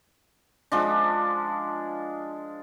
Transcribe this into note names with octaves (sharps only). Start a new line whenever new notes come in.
F3 G#3 D4